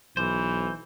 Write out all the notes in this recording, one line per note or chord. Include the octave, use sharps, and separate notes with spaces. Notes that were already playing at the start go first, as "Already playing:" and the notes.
B1 E3 C5